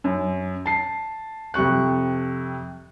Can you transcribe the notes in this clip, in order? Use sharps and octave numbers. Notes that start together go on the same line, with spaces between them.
F#2
A5 C7
F2 C3 C#6 F#6